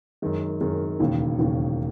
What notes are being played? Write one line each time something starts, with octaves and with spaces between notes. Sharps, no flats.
F#2 D#3 G#3
F#2 D#3 G#3
E1 D#2 C#3
E1 D#2 C#3